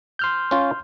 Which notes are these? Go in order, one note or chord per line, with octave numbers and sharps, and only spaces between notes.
C6 F6 G6
C#4 F4